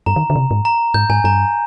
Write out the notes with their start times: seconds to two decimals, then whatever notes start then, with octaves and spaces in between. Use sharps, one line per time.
0.06 G2 A#5
0.16 D#3
0.30 D3
0.36 C3
0.51 G#2
0.65 A#5
0.94 G#2 G6
1.10 G#2 G#5
1.24 G2 A#5